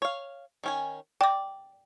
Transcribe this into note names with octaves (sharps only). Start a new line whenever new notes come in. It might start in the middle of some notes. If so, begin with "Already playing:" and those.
C#5 F5
D#3 C#4 G#5
D5 G5 D6